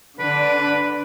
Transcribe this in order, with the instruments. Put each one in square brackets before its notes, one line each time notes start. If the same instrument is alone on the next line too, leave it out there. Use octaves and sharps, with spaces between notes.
[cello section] D3 D4 [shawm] B4